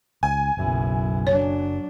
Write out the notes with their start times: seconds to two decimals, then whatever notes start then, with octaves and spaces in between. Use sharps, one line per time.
0.23 C#2 G#5
0.57 F#1 B1 F#2 E4
1.27 F#3 D4 C#5